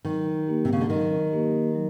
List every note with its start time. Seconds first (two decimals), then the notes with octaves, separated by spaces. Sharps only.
0.05 D#3 F#3
0.47 A#3 D#4 G4
0.65 C3
0.73 C#3
0.81 D3
0.90 D#3 F#3
1.32 A#3 D#4 G4
1.75 F#3